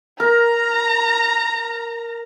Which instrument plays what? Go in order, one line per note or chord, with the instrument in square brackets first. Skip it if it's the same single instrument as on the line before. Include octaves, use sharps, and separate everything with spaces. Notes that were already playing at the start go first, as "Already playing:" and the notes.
[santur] A#4 [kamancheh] A#5